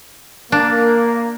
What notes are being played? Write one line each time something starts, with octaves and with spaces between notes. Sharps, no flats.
A#3 D4